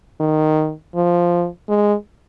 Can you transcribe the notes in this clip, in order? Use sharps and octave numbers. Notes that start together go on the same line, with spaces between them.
D#3
F3
G#3